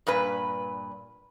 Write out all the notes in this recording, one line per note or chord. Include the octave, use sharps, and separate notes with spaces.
G2 A#2 B4